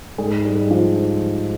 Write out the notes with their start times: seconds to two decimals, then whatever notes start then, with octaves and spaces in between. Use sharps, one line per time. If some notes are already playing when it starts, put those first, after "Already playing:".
0.18 G#2 G#3
0.45 G3
0.71 F3